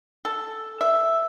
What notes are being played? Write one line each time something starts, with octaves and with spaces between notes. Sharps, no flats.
A4
E5